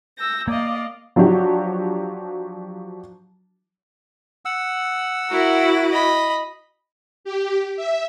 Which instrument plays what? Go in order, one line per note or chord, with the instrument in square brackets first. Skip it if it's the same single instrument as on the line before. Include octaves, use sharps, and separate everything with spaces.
[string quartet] E6 G6 A#6
[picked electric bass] A#3 [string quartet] D5 D#5 F5
[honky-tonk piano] F3 F#3 D4 F#4 G4
[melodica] F#5 E6
[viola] E4 F#4 [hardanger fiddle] A#4
[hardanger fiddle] D#5 B5
[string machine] G4
E5